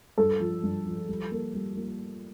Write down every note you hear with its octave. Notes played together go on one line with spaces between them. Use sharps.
G2 A4
F3
G2
F3
G3
A#3
G3
A#3